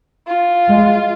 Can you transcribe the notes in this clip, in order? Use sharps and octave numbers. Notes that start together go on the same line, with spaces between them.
F4
G#3